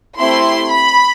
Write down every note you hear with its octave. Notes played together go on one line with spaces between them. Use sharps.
A3 C4 E4 G4 C6
B5